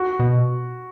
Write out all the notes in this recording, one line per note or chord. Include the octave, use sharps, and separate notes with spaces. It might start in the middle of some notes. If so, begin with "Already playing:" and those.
Already playing: F#4
B2